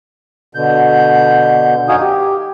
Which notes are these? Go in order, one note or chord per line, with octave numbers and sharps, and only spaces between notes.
B2 D3 G6
F#2 D#4 F#4 F5 G#5 D#6
G4